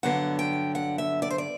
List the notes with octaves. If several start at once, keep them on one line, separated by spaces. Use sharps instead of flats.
G2 D3 F#3 B3 F#5
G5
F#5
E5
D5
C5
D5